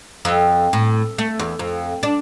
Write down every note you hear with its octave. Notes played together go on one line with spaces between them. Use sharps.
F2
A2
A3
E2
F2
D4